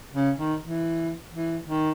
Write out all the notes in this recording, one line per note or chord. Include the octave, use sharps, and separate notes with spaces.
C#3
D#3
E3
E3
D#3